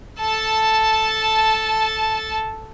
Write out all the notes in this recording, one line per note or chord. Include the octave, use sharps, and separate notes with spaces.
A4 A5